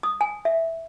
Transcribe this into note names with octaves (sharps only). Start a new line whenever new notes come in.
D#6
G#5
E5